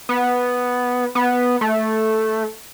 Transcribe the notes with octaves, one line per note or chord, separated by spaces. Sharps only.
B3
B3
A3